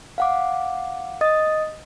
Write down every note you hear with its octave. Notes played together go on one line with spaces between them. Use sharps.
F5 F#5 D6
D#5 D#6 A6